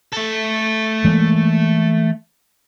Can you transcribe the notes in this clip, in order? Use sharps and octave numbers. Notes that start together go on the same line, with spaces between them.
A3 A4
E3 G#3 A#3